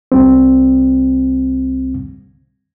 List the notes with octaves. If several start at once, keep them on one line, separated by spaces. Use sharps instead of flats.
C2 G3 C4